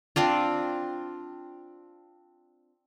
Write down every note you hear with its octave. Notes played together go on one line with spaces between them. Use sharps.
C4 D4 F4